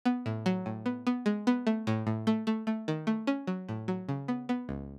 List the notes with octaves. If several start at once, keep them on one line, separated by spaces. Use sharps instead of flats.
B3
A2
F#3
A2
B3
B3
G#3
B3
A3
A2
A2
A3
A3
A3
D#3
A3
C#4
F#3
A2
F#3
C#3
B3
B3
C#2